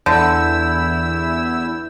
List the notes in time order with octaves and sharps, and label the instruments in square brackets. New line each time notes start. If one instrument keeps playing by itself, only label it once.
[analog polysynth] E2 E4 E6 [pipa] D3 [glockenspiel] G6